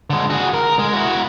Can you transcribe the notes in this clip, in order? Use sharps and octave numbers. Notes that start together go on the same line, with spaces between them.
D3 G#3
F#4 G#4
A#4
G#3
E4 F#4